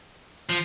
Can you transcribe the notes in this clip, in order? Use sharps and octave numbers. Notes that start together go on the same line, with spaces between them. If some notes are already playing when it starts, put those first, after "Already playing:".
F3